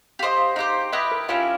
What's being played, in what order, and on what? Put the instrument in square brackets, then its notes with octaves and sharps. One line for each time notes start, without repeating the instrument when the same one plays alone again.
[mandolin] G4 [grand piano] F5
[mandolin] C5 D#5
[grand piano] F5
[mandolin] D#4 G4 C5 [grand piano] F5
[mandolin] E4 G4 B4 D#5 [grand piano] E5
[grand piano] A#4
[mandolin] C#4 E4 G4 A#4 [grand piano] F4